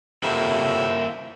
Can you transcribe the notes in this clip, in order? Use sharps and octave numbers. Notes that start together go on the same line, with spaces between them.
F2 C3 F#3 A#3 E4